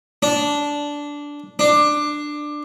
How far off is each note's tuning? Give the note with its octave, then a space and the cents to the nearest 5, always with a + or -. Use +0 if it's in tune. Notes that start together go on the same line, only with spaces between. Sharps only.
D4 -10
D4 +15